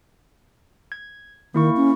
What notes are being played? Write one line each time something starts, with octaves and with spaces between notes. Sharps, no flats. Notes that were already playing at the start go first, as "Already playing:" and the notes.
G#6
D#3 A#3 E4 C#6
C#4